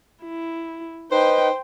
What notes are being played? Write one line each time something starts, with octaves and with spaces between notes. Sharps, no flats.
E4
D#4 B4 C5 G5